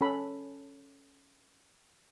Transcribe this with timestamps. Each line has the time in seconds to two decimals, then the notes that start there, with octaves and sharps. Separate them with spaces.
0.01 C#4 A4 B5